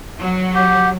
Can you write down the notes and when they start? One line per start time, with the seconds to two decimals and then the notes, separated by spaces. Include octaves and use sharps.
0.19 F#3
0.55 G4 F#5